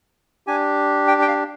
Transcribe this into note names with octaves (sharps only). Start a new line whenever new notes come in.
D4 G4 G#5
G5
G5
F5